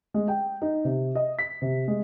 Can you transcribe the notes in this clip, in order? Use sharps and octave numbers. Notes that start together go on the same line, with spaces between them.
G#3
G5
D#4
C3
D#5
B6
C3
G#3